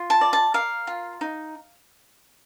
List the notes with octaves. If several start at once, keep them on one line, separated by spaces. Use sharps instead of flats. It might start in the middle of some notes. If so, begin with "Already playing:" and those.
Already playing: F4
A5
D5
A5
A#4 F5
F4
D#4